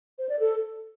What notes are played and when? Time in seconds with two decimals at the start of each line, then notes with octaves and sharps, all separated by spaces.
0.19 C5
0.29 D5
0.40 A4